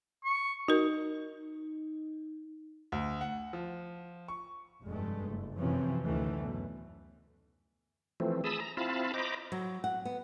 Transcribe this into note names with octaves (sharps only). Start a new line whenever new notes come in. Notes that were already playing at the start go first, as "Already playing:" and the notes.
C#6
D#4 F#4 A#4
D2
F#5
F3
C#6
F1 G2 G#3 A3
F#1
F#2 C3 E3 F3 C4 C#4
D2 A2 D#3 E3 A3
F#2 B2
E3 F3 A3 C4
G#4 A5 B5 D#6 E6
A#5
C4 E4 F4 F5 A5 B5
C5 D#5 A#5 B5 D6
F#3
F#5
B3